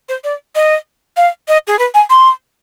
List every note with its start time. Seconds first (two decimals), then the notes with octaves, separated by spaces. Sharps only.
0.09 C5
0.24 D5
0.55 D#5
1.17 F5
1.48 D#5
1.67 G#4
1.79 B4
1.94 G#5
2.10 C6